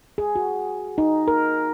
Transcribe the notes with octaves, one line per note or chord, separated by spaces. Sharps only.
G#4
F#4
D#4
A#4